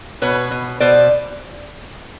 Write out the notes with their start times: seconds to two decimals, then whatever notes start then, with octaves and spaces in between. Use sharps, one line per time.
0.22 B2 B4 C#5
0.51 B2
0.80 B2 C5 D5